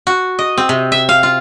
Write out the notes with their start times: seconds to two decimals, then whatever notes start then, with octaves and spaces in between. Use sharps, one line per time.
0.07 F#4
0.39 D#5
0.58 C4
0.69 C3
0.92 E5
1.09 F5
1.23 F4